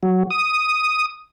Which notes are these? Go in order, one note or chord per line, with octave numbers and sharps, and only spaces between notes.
F#3
D#6